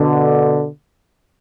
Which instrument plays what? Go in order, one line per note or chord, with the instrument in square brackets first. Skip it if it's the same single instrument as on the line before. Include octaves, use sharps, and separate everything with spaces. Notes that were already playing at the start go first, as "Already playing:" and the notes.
Already playing: [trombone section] B2 D3